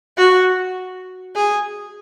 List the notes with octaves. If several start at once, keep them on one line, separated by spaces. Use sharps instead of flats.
F#4
G#4